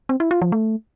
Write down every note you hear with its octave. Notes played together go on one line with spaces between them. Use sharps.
C4
E4
F4
F3
A3